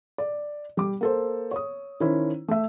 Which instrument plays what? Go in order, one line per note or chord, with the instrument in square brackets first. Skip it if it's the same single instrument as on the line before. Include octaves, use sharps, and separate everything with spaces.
[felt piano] D5
G3 D6
A#3 A4 C5
C#5 D#6
D#3 C#4 E4 C5
A3 E5